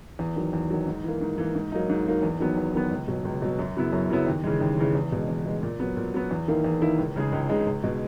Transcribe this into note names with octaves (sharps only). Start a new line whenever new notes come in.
E2
D#3 F#3
E2
D#3 F#3
G#2
E3 A#3
G#2
E3 A#3
G#2
F#3 A#3 D#4
G#2
F#3 A#3 D#4
E2
D#3 F#3 B3
E2
D#3 F#3 B3
C#2
B2 F#3
C#2
B2 F#3
F#2
C#3 F#3 B3 E4
F#2
C#3 F#3 B3 E4
D#2
C#3 E3 G#3
D#2
C#3 E3 G#3
E2
B2 G#3
E2
B2 G#3
A#2
F#3 B3
A#2
F#3 B3
E2
D#3 A#3 E4
E2
D#3 A#3 E4
C#2
C#3 G#3 D#4 G#4
C#2
C#3 G#3 D#4 G#4
C#2
B2 G#3